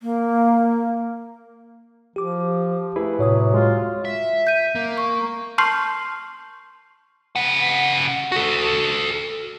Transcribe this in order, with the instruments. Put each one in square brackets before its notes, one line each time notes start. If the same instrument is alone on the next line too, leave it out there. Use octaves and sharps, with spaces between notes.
[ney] A#3
[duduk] F3 [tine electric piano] G4 D6
[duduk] A3 [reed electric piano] E4 G#4 B4
[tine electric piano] A2 C#5 D#6 [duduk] C3 [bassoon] F#3
[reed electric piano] G#3 [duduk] F4
[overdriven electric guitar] E5
[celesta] G6 D#7
[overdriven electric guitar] A#3
[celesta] C#6
[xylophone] A5 C6 C#6 F6 G6 C7
[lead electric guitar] C#3 F#5
F#4 A4